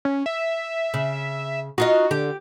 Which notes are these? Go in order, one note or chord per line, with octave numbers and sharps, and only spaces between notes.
C#4
E5
C#3
D#4 F4 F#4 D#5
D3 G4